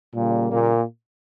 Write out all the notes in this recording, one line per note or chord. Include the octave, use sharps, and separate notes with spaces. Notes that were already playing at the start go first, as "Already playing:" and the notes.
A#2 C#3 G3 A#3
A#2 A#3